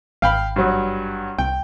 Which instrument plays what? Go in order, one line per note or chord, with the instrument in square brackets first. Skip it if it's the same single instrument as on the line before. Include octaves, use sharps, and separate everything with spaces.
[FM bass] G#1 [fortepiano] F5 G5 B5
[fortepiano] G2 F#3
[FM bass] C2 [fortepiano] G5